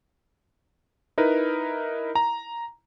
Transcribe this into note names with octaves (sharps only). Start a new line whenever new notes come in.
D#4 E4 A#4 B4
A#5